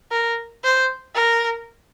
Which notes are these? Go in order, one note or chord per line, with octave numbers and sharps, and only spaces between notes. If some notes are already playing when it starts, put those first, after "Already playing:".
A#4
C5
A#4